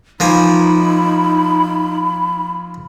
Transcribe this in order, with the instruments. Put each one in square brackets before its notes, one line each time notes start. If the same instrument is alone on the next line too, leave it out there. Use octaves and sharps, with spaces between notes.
[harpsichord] F3 A#3 G#5 [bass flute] D#4 [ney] B5